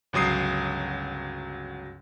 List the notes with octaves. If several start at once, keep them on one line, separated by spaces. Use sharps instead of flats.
G1 C#2 F#3 D#6 C7